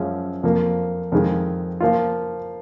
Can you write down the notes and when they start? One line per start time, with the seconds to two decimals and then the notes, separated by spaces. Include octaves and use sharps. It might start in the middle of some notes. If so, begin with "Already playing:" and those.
Already playing: F#2 F3 G#3 C#4 F4
0.43 F2 F3 A#3
1.12 F2 D#3 G#3
1.80 F3 A#3 F4